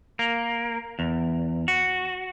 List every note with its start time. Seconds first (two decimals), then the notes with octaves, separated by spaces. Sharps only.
0.19 A#3
0.99 E2
1.68 F#4